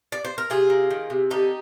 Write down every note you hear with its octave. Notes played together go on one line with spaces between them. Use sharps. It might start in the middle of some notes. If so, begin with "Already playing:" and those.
D5
C5
A#4
C3 F4 G#4
A#3
D#3
C3
D3 D#4 G4